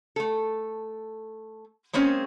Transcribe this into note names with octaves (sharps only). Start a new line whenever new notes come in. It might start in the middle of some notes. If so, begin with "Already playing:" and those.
A3 A4
G#3 A#3 C4 C#4 G#4